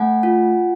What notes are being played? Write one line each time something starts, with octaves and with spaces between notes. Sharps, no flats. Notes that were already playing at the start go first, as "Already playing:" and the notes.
Already playing: A3 F#5 G#5
F4